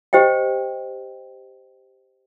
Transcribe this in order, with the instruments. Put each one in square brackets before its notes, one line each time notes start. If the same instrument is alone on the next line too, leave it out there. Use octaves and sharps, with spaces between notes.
[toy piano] G4 C5 D#5 G5